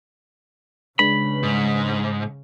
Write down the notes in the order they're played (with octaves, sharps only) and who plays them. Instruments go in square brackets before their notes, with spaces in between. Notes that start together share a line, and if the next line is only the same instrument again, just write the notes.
[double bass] C#3 [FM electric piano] G#3 D4 B4 [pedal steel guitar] B5
[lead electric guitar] G#2